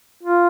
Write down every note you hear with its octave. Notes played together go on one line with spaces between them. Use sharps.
F4